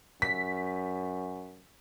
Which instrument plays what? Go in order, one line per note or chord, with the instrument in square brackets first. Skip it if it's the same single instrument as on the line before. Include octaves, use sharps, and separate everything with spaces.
[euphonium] F#2 [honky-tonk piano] B6